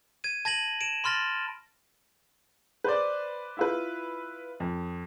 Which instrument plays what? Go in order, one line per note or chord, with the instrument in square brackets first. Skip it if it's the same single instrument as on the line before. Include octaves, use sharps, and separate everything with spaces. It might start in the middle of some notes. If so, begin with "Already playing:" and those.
[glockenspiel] G#6 D#7
A5 G#6 A#6 D#7 F#7
D7 E7
B5 C6 F6 A6 A#6
[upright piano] B4 C5 D5
E4 F4 B4
F2